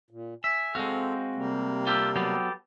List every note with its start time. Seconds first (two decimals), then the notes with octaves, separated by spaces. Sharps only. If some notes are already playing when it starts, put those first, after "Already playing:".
0.11 A#2
0.44 E5 G#5
0.75 G#3 C4 F#4 A4 F5
1.36 C3 G3 A#3
1.87 F4 G4 A4
2.16 F#3 B3 G4 A4